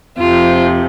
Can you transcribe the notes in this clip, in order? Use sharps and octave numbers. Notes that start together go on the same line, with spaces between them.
F2 C3 F3 F4